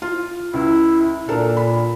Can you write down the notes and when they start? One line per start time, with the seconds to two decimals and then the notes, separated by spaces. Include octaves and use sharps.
0.02 F4
0.54 C#2 E4
1.28 A#2 D4 A4 A#4
1.57 B5